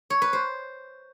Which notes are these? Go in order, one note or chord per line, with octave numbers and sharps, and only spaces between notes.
C#5
B4
C5